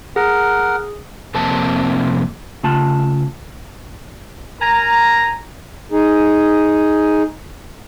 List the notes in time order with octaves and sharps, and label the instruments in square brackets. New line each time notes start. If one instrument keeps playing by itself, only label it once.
[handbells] G#4 [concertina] A#4 F#5
[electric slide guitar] F2 C3 A#3 C4 A5
[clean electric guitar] C#3 A3 F4 A5
[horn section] A#4 G#5 A#5
[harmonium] D#4 G#4